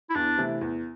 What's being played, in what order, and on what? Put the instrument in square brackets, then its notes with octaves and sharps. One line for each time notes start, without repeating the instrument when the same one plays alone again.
[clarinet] E4
[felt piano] E2 [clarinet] D4
[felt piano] C3 E3 A3 E4
E2